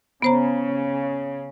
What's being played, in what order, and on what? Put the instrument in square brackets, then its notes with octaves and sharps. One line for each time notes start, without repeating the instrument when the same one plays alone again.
[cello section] C#3 [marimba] B3 C5 A#5